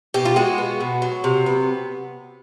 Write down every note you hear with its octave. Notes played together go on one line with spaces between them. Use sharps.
B2 G4
F4
G#3 F#4
B3
B2
F#3
C3
B3